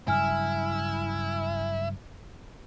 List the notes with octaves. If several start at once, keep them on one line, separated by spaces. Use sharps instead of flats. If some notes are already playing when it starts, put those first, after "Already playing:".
G2 C#3 F#3 E4 G#5 F6